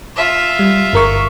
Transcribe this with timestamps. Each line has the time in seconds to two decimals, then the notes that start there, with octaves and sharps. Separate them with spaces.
0.16 F4 E5
0.59 G3
0.93 G1 A#4 C#6